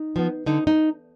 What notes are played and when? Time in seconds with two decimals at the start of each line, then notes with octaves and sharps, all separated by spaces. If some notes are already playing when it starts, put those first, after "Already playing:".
Already playing: D#4
0.16 F3 B3
0.46 D3 D#4
0.67 D#4